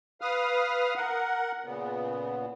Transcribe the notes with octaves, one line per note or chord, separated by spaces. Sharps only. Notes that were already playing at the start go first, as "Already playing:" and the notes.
B4 F5 D#6 F6
A#4 F#5
A#2 C#3 B3